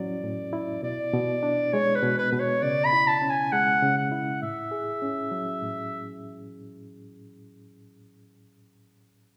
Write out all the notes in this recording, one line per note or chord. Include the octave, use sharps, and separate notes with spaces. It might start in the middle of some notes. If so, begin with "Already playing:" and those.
Already playing: A2 F#3 C#4 E4 D5
A2
E4
B2 D5
B2
D4
G#3 C#5
B4
B2
B4
B2 B4
C#5
C#3 D5
B5
E4
A5
C#4
G#5
G#3 F#5
C#3
F#5
E4
A2 E5
G#4
C#4
F#3
A2